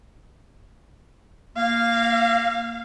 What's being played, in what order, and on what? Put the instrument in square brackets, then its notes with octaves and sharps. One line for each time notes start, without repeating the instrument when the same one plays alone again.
[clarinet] A#3 [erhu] F5